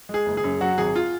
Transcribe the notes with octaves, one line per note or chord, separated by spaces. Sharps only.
G#3 G#4
F#1
G#4
F#2
F#3 F#4
G#1 G#4
F4